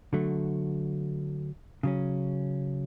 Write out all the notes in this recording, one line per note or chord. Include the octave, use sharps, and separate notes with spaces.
D3 F#3 A3
C#3 F#3 C#4